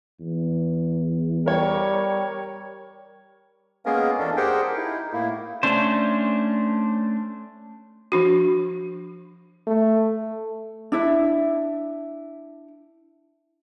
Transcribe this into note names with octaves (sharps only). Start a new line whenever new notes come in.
E2
G3 A#4 C#5 G5
G#3 A#3 B3 C#4 G#4 A#4
E2 C#4 D4 A4
G4 G#4 A#4 C5 F#5 G5
D#4 E4
A2 A#3 E4
A3 C#4 D4 C5
F3 D4 F#4
A3
D4 E4 E5